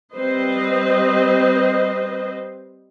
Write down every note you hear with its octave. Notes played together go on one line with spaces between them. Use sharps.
G3 C4 B4 C5 D#5